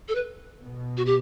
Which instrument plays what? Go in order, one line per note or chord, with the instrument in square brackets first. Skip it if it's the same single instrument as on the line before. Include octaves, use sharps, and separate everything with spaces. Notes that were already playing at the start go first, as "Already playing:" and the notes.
[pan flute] A4
B4
[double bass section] B2
[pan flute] F#4
G4